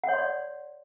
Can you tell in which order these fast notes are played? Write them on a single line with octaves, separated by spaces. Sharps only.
F#5 C#5 C6 D5